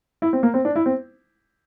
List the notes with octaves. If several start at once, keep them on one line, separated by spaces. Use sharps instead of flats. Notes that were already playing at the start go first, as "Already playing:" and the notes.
E4
C4
A#3
C4
D4
E4
C4